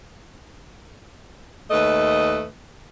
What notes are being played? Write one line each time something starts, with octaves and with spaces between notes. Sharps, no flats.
D#2 A3 B4 D#5